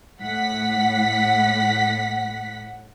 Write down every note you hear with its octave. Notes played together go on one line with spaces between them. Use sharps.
A2 F#5 B6